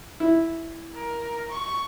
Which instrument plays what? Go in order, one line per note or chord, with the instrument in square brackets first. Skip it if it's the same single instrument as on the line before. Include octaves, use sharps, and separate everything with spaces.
[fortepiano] E4
[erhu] A#4
C#6